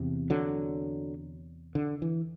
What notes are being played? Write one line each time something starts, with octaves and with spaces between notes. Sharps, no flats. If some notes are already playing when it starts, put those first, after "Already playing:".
Already playing: E2 C3
D3 F#3
D3
E3